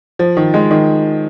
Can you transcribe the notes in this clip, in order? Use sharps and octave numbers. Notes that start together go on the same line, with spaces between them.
F3
D#3
G#3
D#3